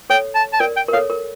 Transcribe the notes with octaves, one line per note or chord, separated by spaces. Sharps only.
A4 C#5 G5
A5
A5
A#4 D5 G5
G5
A#4
A4 C#5 F5
A#4